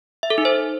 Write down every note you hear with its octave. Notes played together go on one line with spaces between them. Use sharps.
E5
A4
D#4
C5